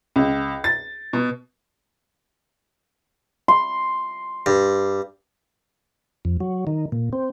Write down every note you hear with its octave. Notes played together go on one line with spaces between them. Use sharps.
C#2
A6
B2
C6
G2
F2
F#3
D#3
A#2
C4